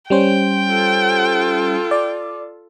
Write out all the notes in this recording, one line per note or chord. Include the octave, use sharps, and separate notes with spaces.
G3 C#4 C5 G5
F4 A4
D5